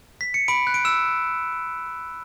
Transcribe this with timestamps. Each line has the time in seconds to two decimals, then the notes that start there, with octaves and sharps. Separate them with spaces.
0.21 B6
0.34 C#7
0.48 B5 D7
0.67 F#6
0.74 D7
0.85 E6 E7